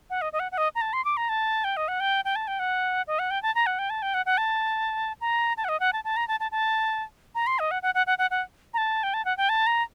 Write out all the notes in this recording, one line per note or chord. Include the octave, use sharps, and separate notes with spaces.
F#5
D#5
D#5
F#5
F#5
D#5
A#5
A5
C6
D6
A#5
A5
G5
D#5
F#5
G5
G5
A5
G5
F#5
D#5
F#5
G5
A5
A#5
F#5
G5
A5
G5
F#5
F#5
A5
A#5
A5
F#5
D#5
F#5
A5
A5
A#5
A5
A5
A5
A#5
C6
D#5
F#5
F#5
F#5
F#5
F#5
F#5
A#5
A5
G5
A5
F#5
G5
A5
A#5